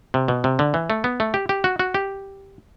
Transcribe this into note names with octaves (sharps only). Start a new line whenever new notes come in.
C3
B2
C3
D3
E3
A3
B3
A3
G4
G4
F#4
F#4
G4